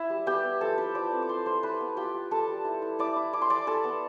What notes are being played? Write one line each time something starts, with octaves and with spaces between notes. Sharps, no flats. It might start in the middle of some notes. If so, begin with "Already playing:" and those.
Already playing: E4 E5
G3
B3 G4 G5
B3
F3 A4 A5
E4 B4 B5
F3 D5 D6
C4
D6
B3 C5 C6
E4 C5 C6
E4 B4 B5
B3
F4 G4 G5
F4
G3 A4 A5
G3
E4
E4
E4 D5 D6
E4
E4 D6
C6
E4 D5 D6
E4 A4 A5
B3